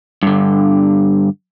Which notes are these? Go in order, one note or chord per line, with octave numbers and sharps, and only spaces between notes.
G2 D3